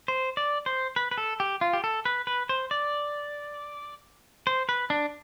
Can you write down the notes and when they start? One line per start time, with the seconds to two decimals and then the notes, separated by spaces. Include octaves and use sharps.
0.08 C5
0.37 D5
0.66 C5
0.96 B4
1.11 B4
1.18 A4
1.40 G4
1.61 F4
1.73 G4
1.84 A4
2.05 B4
2.27 B4
2.49 C5
2.71 D5
4.47 C5
4.69 B4
4.90 D4